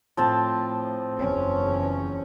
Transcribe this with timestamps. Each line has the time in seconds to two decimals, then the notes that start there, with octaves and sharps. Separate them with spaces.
0.17 A2 F3 C4 A5
1.19 F#1 E2 C#4